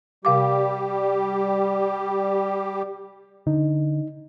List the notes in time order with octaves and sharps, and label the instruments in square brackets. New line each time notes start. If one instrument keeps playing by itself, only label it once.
[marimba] C3 F5 D6 [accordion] G3 G4
[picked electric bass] D3 [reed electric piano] D#4